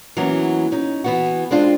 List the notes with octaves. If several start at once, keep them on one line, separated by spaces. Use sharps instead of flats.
E3 F#3 A#3 B3 C#4
C#4 D#4
E3 B3 F#4
G#3 C4 D4 F4